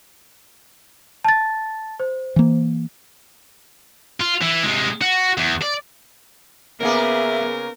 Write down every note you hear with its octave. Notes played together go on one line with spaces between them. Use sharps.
A5 A6
C5
E3 A#3
F4
E3
C3 G#3
F#4
E2
D5
C#3 A#3 B3 G#4 A#4 E5